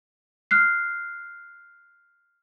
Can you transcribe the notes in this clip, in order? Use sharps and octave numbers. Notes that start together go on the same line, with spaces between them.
F6 F#6 C7